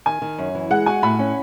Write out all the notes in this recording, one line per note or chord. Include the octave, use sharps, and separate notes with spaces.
D#3 G#5
D#3
F#2
E3
G#3 F#5
F#4 G#5
A2 B5
C#4